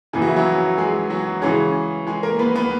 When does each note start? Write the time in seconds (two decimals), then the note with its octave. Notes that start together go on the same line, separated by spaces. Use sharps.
0.13 F#2 C#3 E3 B3 G#4
0.22 F#4
0.29 E4
0.36 F#3 F#4
0.78 G#3 G#4
1.10 F#3 F#4
1.42 C#3 E3 G#3 C#4 G#4
2.07 G#3 G#4
2.23 A#3 A#4
2.39 B3 B4
2.55 B3 B4